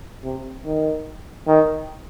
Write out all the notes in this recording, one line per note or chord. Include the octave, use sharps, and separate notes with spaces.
C3
D#3
D#3